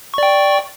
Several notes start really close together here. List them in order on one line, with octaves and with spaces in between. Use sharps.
C#6 D5 G5